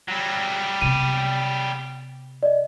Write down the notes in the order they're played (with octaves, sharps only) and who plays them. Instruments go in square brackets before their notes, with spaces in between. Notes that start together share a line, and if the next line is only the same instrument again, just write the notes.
[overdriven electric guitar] F#3 G3
[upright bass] C3 B3 [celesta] D#7
[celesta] D5 D#5